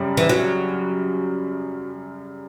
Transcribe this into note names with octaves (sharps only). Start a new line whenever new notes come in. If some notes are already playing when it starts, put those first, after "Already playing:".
Already playing: F#2 C#3 G3 G4
E3
F#3